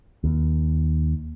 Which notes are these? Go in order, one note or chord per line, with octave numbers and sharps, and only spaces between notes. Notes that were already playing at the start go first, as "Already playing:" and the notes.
D#2